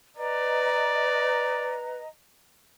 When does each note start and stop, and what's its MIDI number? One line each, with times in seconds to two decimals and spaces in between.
0.17 1.97 71
0.17 1.79 74
0.17 2.08 75
0.17 2.08 82